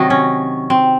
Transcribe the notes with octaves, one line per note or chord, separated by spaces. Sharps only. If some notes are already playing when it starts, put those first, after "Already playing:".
Already playing: C3 D#3 F#3 D#4
C#4
C4